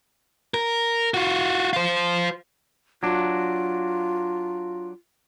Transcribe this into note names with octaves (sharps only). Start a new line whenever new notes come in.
A#4
F4 F#4
F4 C5
F#3 D4 F4